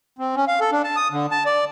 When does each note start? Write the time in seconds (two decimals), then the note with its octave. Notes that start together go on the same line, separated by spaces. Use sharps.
0.19 C4
0.35 C#4
0.48 F5
0.61 A4
0.72 D4
0.84 A5
0.96 D#6
1.11 D3
1.31 A5
1.46 D5